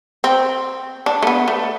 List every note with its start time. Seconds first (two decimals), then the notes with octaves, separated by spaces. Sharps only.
0.24 C4
1.06 D4
1.23 A3
1.27 B3
1.48 A3